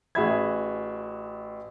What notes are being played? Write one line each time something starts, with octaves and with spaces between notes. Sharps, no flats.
A1 F#4 G#4 E5 B5 G#6